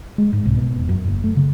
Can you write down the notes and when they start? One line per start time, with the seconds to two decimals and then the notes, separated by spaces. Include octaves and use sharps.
0.18 G#3
0.33 G#2
0.46 C2
0.57 B2
0.77 E1
0.89 F#2
1.08 F#1
1.24 A3
1.36 C#3